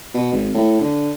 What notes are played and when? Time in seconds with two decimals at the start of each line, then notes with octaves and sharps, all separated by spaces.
0.14 B2
0.33 G#1
0.54 A2
0.81 D3